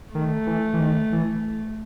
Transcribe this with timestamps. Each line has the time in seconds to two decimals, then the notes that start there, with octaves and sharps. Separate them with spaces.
0.15 D#3 A3
0.47 E3
0.74 E3
0.80 D#3
1.13 E3